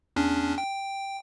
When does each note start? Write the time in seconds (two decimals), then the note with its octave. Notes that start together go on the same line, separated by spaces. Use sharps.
0.16 E2 C#4 D4
0.58 G5